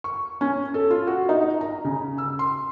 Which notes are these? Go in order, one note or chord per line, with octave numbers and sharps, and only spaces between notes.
C#6
C#4
A4
F4
F#4
D#4
A#5
C#3
E6
C6